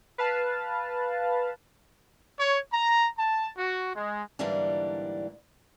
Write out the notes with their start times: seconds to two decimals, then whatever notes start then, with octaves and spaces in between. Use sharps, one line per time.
0.18 B4 F5 A5
2.38 C#5
2.72 A#5
3.17 A5
3.56 F#4
3.94 G#3
4.39 G#2 D3 E3 G3 A#3 D4